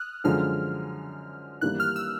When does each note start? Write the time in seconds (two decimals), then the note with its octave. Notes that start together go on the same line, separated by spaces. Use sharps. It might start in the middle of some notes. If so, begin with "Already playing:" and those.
Already playing: D#6 F6 F#6
0.24 F#2 D3 F3 G#3 F6
1.61 G#1 G2 E3 G3 A#3 F#6
1.80 F6
1.96 E6